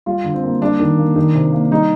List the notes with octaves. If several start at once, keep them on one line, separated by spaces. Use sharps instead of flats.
G3 F4
D3
C4
A#3
G3 D4
D#3
A#3
D#3
C3
A#3
G3 D#4